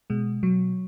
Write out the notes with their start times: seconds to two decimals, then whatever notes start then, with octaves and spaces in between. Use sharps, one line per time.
0.10 B2 G#3
0.43 B2 F#3